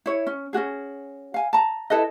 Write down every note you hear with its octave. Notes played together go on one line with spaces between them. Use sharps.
E4 C#5
C#4
C#4 D4 F#4 G#4
F5 G#5
A5 A#5
E4 A4 B4 D#5